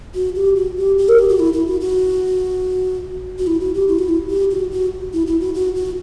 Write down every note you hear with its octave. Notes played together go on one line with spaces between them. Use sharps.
F#4
G4
F#4
G4
G4
A#4
G4
F#4
E4
E4
F#4
F#4
F#4
E4
F#4
G4
E4
F#4
E4
G4
F#4
F#4
E4
E4
F#4
F#4
F#4